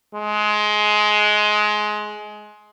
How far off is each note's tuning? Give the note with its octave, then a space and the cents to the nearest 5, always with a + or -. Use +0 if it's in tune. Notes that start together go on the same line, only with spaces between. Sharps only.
G#3 +20